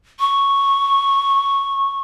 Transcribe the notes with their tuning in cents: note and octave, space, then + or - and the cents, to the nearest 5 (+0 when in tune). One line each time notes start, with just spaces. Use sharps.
C#6 -5